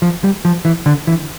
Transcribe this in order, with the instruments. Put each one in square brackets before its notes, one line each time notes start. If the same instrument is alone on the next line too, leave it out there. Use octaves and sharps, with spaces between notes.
[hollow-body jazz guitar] F3
G3
F3
E3
D3
E3